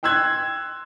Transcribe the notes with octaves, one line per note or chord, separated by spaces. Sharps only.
G5 C6 E6 F#6 G#6